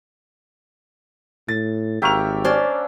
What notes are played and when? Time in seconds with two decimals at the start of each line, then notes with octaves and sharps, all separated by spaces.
1.49 A2 A6
2.02 G#1 A#3 G4 E5 G5 C#6 F7
2.45 C#4 D4 C5 D5